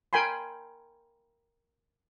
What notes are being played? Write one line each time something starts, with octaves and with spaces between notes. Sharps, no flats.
A#4 G5 G#5 B5 C6